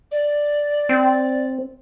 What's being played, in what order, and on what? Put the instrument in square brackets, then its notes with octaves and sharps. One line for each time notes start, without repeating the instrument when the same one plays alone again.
[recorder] D5
[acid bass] C4